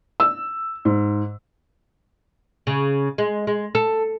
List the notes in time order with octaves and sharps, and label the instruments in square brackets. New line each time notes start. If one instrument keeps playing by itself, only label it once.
[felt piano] E6
G#2
[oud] C#3
G#3
G#3
A4